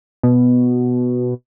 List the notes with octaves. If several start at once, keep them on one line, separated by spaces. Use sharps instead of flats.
B2